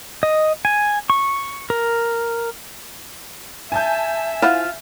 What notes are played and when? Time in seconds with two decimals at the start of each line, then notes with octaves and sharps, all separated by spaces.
0.23 D#5
0.65 G#5
1.10 C#6
1.70 A#4
3.72 E5 G#5 A5 G6
4.42 E4 F4 C5 F5 F#5